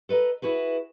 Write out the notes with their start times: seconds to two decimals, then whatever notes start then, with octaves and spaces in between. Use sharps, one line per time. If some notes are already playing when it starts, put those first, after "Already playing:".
0.09 A4 B4 D#5 A#5
0.42 E4 F#4 G#4 B4